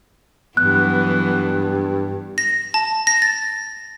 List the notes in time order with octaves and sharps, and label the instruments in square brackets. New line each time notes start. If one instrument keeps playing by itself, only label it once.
[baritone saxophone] G2 [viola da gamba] E3 F#3 B3 [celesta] F#6
[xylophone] A#6
A5
A#6
A6